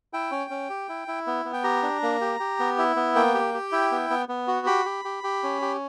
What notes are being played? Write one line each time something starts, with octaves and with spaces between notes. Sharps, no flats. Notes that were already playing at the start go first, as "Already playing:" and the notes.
E4 G5
C#4
C#4
G4
E4
E4
B3
B3
G5
G4 A#5
D4
A#3
G4
G4
B3
E4
B3
A#3 G5
G4
G4
E4
B3
B3
B3
F#4
G4 B5
G4
G4
G4
C#4
G4